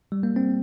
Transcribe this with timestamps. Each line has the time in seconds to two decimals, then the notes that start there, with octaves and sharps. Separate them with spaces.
0.12 G3
0.23 A#3
0.36 C4